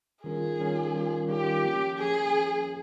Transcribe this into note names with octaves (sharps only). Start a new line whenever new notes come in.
D#3 G3 C#4 F4 G#4 A#4
D#3 G3 C#4 F4 A#4
D#3 G3 C#4 F4 A#4
D#3 G3 C#4 F4 G4 A#4
F3 A#3 C#4
F3 A#3 C#4 G#4
F3 A#3 C#4